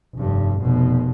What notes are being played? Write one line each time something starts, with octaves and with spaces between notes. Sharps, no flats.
F1 G2
F1 B2